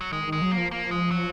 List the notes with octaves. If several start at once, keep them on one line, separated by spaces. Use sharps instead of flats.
F#3
D#3 G#3
D#3
G#3
F#3
A#3
F3
A#3
G#3
F#3